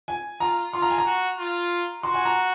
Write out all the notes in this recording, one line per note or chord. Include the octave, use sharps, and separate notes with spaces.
G#5
F4 A#5
F4 C6
A#5
G#5
A#5
F#4
F4
F#4 C6
G#5
A#5